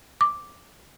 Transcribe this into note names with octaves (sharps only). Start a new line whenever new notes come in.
D6